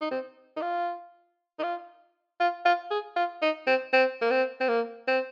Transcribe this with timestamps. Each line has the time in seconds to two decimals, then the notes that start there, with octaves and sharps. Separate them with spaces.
0.01 D#4
0.11 C4
0.57 D#4
0.62 F4
1.59 D#4
1.63 F4
2.40 F4
2.65 F4
2.91 G#4
3.16 F4
3.42 D#4
3.67 C4
3.93 C4
4.22 A#3
4.31 C4
4.61 C4
4.69 A#3
5.07 C4